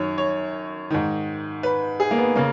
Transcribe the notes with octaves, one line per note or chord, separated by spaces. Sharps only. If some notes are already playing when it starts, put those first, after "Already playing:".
Already playing: F#2 D#3 C#5
C#5
G#2 D#3
B4
G#4
A#3
B3
C#3 A#3